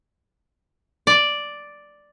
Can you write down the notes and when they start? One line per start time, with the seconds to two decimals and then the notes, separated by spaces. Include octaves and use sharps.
1.07 D5